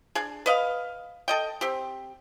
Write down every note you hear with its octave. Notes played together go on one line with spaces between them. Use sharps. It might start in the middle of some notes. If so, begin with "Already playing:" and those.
D4 G#4
B4 D#5 F5
A4 D#5 G5
C4 G4